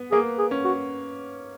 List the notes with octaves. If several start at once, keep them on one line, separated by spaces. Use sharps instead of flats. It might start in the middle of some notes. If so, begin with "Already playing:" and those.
Already playing: B3
A#3 G#4
G#4
C#4
F#4